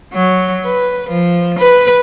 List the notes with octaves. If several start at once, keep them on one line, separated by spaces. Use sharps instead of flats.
F#3
B4
F3
B4